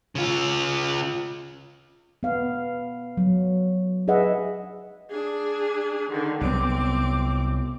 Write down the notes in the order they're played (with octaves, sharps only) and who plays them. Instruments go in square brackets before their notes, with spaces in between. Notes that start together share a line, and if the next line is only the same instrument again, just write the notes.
[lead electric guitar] C#3 F4
[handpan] B3 F5
F#3
G#4 B4 D#5 E5 F#5
[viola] D4 G#4
D3 D#3
[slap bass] C2 F#3 B3 [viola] C4 D6